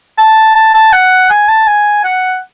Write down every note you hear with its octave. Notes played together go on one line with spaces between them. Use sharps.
A5
A5
A5
F#5
G#5
A5
G#5
F#5